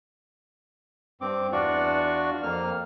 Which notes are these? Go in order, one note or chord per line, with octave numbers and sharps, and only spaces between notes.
G2 C4 D6
E2 D4 F4 F#4 D5 C#6
F2 A#3 F6